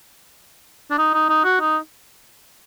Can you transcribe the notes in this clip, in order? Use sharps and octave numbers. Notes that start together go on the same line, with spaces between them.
D4
D#4
D#4
D#4
F#4
D#4